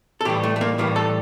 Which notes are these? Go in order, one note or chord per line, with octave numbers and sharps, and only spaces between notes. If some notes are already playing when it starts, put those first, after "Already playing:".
A4
A2 E3 G3 G4
A3
A3
A#3
A2 E3 G3 A#3
A4